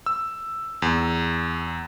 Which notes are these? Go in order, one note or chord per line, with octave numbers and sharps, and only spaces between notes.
E6
E2